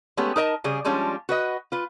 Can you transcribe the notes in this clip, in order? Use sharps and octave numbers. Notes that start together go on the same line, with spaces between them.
G#3 A3 B3 C#4 G4
D#4 A#4 D#5 A5
C#3 G3 G#4
F3 G3 G#3 C#4 D4 F4
F#4 B4 D#5
F4 B4